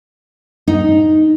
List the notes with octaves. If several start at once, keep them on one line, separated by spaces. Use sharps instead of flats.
D#4